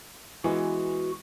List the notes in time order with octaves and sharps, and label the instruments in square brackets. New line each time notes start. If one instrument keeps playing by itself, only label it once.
[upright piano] E3 G#3 B3 [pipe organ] F#4